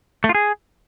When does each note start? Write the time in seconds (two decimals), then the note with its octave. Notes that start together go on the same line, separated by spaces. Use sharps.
0.24 A3
0.29 F4
0.35 G#4